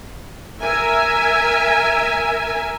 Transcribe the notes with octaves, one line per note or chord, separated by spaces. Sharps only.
A#4 E5 G#5